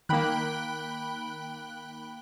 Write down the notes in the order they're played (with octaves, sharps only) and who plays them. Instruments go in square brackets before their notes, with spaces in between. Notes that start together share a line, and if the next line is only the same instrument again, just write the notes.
[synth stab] D#3 A#3 [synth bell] G5 B5 F#6